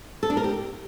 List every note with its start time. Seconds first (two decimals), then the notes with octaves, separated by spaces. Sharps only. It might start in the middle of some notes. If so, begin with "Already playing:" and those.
0.23 A4
0.30 D4
0.37 A#4
0.44 G4